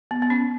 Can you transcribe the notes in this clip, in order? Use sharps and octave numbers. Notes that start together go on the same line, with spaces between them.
B3
B3
C#4